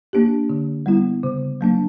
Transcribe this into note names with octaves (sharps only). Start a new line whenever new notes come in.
A#3 D4 G4
D3
G3 B3 E4
C#3
F#3 A#3 D4